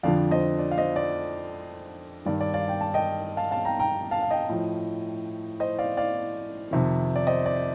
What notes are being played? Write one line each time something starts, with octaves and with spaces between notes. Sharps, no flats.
F2 D3 F3 D5 F5
C5 D#5
D5
F5
C5 D#5
D5
G2 D#3 D5
D5
D5 F5
G5
A5
D#5 G5
F5 A5
F5 A5
G5 A#5
G5 A#5
F5 A5
F5
D#5 G5
A2 F3
C5 D#5
D5 F5
D5 F5
F2 C3 D#3
D5
C5 D#5
D5